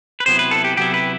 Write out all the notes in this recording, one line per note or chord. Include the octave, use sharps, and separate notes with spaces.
B4
C3 F#3 B3 E4 C5
B4
A4
G4
C3 F#3 B3 E4 G4
B4